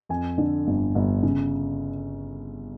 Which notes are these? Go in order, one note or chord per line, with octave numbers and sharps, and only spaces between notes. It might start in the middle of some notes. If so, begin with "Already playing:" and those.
F2 G#5
D3
G1
G1
C#3